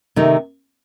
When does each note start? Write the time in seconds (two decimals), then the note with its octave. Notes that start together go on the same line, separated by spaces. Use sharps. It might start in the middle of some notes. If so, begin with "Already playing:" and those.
0.16 C3 D#3 A3 D#4